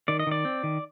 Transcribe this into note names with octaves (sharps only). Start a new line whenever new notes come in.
D#3 D5
D#5
D#3 D5
C4
D#3